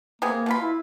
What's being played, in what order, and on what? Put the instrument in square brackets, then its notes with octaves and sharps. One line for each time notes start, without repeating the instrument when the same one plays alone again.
[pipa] C3 B3 G#4 [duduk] A#3
[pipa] B2 F4 B5
[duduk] E4